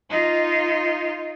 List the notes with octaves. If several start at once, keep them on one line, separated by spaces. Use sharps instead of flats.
D#4 F4